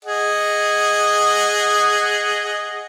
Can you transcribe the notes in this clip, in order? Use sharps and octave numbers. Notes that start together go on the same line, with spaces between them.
G#4 D#5 F#5